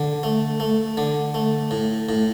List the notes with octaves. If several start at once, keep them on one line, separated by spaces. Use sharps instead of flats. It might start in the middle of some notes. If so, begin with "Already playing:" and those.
Already playing: D3
A3
A3
D3
A3
A2
A2